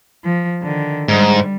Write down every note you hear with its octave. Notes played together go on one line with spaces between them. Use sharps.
F3
D3 D#3
G#2 G3